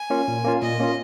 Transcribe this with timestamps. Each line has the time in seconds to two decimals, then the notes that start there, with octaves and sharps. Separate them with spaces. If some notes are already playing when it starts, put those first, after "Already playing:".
Already playing: G#5
0.10 A#3 C#4 F4
0.28 A#2
0.44 A#3 C#4 F4
0.62 A#2 D#5
0.80 A#3 C#4 F4